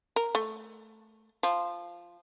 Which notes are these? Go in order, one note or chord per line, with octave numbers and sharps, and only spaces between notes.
A#4
A3
F3